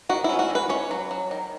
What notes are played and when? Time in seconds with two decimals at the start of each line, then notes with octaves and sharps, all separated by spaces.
0.09 D#3 F#4
0.24 C#4 E4
0.39 F#4
0.50 D#3
0.55 B4
0.69 C#4 C#5
0.91 F#3
1.11 F#3
1.31 D#3